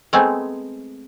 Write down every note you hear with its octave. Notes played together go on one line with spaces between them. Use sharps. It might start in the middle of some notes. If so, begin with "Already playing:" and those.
G#3 A3 B3 C4